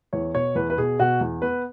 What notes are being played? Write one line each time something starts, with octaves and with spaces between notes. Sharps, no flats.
E2 C#5
B2 C#5
E2 B4
B4
B2 G#4
B2 F#4
E2
B3 B4